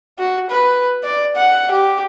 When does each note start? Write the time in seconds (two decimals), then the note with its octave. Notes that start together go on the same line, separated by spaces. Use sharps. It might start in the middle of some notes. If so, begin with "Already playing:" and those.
0.19 F#4
0.50 B4
1.04 D5
1.36 F#5
1.71 G4